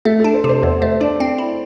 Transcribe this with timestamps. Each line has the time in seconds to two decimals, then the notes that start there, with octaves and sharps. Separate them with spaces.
0.05 A3 A4
0.20 A4
0.24 D4
0.34 C5
0.44 C3
0.49 C5
0.63 E2 C5
0.82 A3 C5
1.00 D4 D5
1.20 C4
1.38 E4